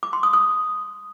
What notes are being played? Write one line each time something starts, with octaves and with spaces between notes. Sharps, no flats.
D6
C6
D#6
D#6